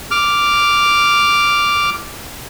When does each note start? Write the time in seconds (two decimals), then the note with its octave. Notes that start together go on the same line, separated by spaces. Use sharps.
0.11 D6 F6